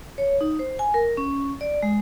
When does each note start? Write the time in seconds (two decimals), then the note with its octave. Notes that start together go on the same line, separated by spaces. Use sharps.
0.18 C#5
0.41 D#4
0.59 C5
0.79 G#5
0.94 A#4
1.17 C#4
1.61 D5
1.83 G#3